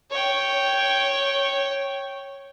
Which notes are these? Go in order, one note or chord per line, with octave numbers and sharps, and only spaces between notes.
C#5 G5